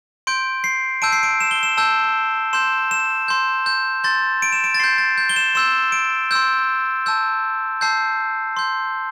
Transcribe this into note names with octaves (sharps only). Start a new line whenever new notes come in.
C6 G6 D7
C7
A5 E6 G6 D7
C7
D7
E7
G7
E7
A5 E6 G6
C6 G6 E7
E7
C6 G6
G6
C6 G6 A6
D7
E7
D7
A6
C6 G6 C7
A6
G6
G7
E7
C6 E6 G6 E7
D7
C6 E6 G6
A5 E6 G6
A5 E6 G6 C7
C6 G6